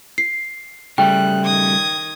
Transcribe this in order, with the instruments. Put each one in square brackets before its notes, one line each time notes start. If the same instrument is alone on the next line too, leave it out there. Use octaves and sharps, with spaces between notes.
[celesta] C7
[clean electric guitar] C#3 G3 A3 [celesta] G5 [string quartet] F#6
[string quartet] D#3 D#6 G#6